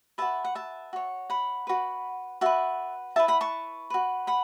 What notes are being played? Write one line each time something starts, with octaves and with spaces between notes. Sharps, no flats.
F#4 B4 E5 A5
F#5
E5 A5
F#4 C#5
F#5 B5
F#4 B4
F#4 B4 E5 A5
E4 B4 E5 A5
F#5 B5
A5 C#6
F#4 B4
F#5 B5